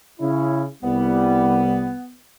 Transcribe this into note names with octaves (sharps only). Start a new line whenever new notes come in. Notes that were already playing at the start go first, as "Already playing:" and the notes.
C#3 C#4 E4
C2 G3 B3